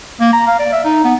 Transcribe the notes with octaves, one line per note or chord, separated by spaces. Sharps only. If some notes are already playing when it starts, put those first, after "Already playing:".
A#3
A#5
F5
D5
E5
D#4
B3